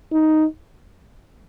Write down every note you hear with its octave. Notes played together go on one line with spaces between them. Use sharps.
D#4